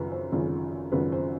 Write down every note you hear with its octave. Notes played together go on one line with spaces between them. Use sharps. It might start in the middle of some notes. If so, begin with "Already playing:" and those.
Already playing: G#1 F#2 C#3 F3 B4
C5
G#1 F#2 C#3 F3
G#1 F#2 C#3 F3 B4
C5